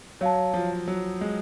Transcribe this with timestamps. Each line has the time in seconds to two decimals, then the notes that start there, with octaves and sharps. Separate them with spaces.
0.21 F#3 C#5 F5 A5
0.54 F3
0.88 F#3
1.21 G#3